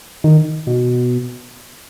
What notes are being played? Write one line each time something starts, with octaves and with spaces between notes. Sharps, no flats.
D#3
B2